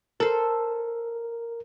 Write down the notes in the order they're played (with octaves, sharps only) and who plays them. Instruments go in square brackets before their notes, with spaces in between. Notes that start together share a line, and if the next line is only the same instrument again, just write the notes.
[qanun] A4 C5 [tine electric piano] A#4